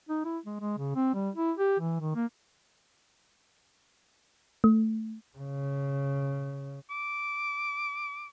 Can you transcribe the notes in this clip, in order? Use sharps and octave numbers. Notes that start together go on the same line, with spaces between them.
D#4
E4
G#3
G#3
C#3
C4
G3
E4
G4
E3
D#3
A#3
A3
C#3
D6